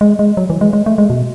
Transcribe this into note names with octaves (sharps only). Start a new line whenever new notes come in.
G#3
G#3
F#3
E3
G#3
G#3
A3
G#3
B2